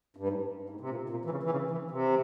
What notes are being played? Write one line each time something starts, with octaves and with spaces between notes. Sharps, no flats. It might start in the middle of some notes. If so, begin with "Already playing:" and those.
G2
G#2
G#2
C3
A#2
A#2
E3
C#3
E3
C#3
E3
C3